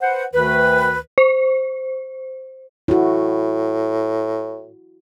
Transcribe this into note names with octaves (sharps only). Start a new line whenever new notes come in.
B4 C5 F#5
D2 D#3 B4
C5
A2 E4 F#4